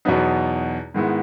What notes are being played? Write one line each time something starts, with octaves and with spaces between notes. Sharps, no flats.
E2 B2 F#3 B3 D#4
G#2 D#3 G#3 B3 E4